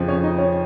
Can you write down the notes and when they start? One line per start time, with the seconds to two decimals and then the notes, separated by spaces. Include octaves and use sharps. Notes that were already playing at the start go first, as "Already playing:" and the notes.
Already playing: F2 C#3 F3
0.08 C#4 C#5
0.23 D#4 D#5
0.38 C#4 C#5